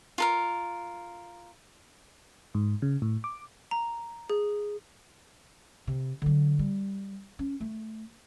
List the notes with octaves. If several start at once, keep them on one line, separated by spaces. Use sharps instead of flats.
F4 A4 A#4
G#2
C#3
A2
D6
A#5
G#4
C3
D3 F#3
G3
C#4
A3